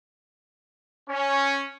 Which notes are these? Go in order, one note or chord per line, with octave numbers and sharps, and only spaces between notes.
C#4